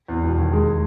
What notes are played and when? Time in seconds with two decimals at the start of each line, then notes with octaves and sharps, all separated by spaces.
0.08 E2
0.23 E1
0.38 D#2
0.53 G#3
0.67 G#3